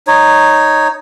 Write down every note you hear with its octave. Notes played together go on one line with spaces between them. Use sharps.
D#4 C#5